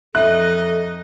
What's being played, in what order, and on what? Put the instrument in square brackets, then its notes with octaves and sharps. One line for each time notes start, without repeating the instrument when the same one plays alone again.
[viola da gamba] F2 D#4 D#5 [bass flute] A4 [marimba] E5 [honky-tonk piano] F#6